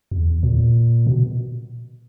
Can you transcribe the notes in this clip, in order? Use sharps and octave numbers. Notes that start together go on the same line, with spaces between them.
E2
A#2
B2